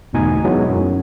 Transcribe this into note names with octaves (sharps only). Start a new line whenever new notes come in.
G1 E2 B2 A3 D#4 G#5
F#3 G#3 B3 D#4 E4
F#2